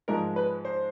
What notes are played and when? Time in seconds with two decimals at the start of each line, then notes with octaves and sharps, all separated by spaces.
0.08 G#2 F3 G#3 A#4
0.36 B4
0.65 C5